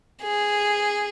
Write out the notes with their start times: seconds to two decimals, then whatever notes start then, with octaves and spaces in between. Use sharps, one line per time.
0.22 G#4